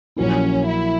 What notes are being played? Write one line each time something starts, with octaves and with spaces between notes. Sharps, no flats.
A#1 A#2 F#3 A#3 C#4 E4
E4